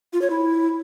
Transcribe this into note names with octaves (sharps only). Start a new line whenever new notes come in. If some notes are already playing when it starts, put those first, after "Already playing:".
F4
C#5
E4